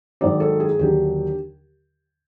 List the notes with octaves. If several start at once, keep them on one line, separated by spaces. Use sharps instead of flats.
G#2 D#3 F#3 D5
A4
G#4
D#2 D3 F#3 G4